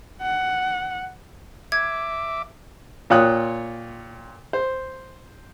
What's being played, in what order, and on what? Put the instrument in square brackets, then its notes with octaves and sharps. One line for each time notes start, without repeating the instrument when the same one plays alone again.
[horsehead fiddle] F#5
[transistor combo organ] E5 D6 [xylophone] G#6
[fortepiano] A#2 F4 C#5 G5 D#6 F#6
C5